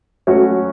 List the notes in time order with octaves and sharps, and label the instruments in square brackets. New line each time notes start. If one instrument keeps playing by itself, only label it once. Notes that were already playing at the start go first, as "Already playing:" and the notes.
[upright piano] F#3 A3 C#4 F#4